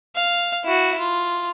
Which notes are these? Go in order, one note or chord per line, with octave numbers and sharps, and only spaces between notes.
F5
E4 F#4
F4